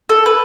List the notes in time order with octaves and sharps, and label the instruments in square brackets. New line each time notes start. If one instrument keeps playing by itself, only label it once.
[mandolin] A4
B4